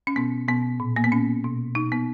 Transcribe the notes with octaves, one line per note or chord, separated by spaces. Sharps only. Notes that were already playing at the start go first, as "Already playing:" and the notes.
C#4
B2 B3
B2 B3
A#2
A#3
B3
A#2 C#4
B2
B2 D#4
B3